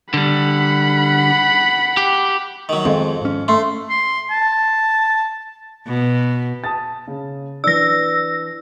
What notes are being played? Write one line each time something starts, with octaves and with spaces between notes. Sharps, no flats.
D3 G3 F#5 B5
G4
D#3 F#3
F2 D#3 G#3 C4
G#2 C#4
A3 C6
C6
A5
B2
A5 D#6 A6
C#3
E3 D4 E6 A#6